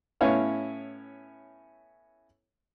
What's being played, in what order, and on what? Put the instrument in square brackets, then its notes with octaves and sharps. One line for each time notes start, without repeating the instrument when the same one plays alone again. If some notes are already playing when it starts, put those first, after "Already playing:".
[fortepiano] A2 B3 C#4 E4 C#5 F5